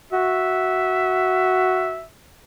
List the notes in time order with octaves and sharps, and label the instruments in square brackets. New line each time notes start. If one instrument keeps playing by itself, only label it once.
[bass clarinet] F#4 [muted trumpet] E5